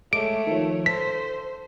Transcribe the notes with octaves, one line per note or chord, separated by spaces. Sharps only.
G#3 A3 C#5 D6 D7
D#3 F3
A4 C5 B6